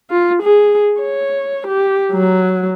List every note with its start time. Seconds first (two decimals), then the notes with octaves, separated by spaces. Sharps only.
0.11 F4
0.43 G#4
1.01 C#5
1.67 G4
2.12 F#3